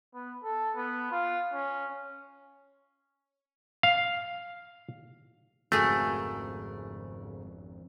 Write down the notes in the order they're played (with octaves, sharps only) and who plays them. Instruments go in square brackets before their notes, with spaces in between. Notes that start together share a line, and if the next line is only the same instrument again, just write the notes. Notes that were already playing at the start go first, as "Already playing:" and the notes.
[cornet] B3
A4
B3
F4
C#4
[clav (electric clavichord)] F5
[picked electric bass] G#1 F2 [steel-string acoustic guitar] G#2 C#3 A#4 [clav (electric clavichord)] A3 [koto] F#4 G#4